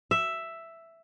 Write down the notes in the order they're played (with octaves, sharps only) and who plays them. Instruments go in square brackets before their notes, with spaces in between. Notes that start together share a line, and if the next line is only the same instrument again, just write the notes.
[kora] E5